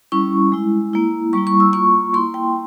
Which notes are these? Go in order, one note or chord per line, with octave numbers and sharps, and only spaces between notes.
G3 C#4 E4 C#6
G#3 E4
A#3 E4
G3 A#3 E4 C#6
C#6
E6
A#3 F4 C#6
A#3 E4 C6
G5